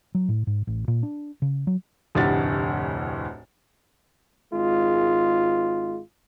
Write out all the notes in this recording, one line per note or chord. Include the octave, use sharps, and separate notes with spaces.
F#3
A2
G#2
A1
A#2
D4
C#3
F#3
F1 D2 A2 G4 F#5 A6
G#1 G#3 F4